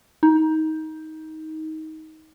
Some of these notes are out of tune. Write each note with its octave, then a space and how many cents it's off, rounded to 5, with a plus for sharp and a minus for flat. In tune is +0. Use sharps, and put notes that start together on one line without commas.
D#4 +20